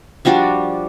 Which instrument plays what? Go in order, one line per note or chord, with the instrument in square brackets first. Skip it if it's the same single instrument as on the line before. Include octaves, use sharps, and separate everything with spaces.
[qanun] F3 G3 D4 F#4